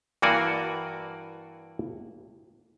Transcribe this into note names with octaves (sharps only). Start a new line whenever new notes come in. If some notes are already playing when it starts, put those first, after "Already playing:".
G2 E3 A#3 F#4 D5 G#5